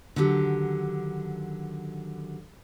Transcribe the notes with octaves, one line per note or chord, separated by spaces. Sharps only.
D3 D#3 F#3 G4